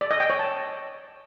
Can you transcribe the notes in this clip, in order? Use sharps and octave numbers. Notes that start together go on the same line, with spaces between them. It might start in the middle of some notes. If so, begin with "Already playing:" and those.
D5
D#5
G5
C#5
A5